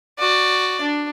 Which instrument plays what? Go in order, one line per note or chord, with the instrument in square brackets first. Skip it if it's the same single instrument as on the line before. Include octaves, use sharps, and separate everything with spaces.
[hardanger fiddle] F#4 D5
D4